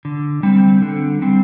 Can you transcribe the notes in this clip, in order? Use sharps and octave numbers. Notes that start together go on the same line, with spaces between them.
D3
G3 C4
D3
G3 C4